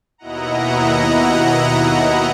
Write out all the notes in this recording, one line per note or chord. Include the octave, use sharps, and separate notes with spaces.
D#2 B2 E4 D#5 F#5 A#5